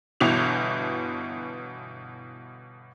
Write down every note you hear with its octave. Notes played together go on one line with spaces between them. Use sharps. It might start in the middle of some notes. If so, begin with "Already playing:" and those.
G1 B2 E3 F7